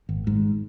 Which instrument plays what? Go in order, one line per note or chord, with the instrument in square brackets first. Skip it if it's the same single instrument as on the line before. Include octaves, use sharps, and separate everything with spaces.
[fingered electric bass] G#1
G#2